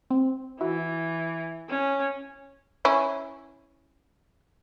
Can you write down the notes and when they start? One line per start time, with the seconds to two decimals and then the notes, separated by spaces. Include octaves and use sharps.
0.10 C4
0.61 E3 E4 F#4
1.70 C#4
2.85 C#4 E4